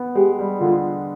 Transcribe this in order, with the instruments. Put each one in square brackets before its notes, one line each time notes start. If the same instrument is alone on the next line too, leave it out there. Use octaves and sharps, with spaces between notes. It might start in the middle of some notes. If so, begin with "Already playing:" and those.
Already playing: [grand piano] B3
[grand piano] G#3 [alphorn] G4
[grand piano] G3
[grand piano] D3 [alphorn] F4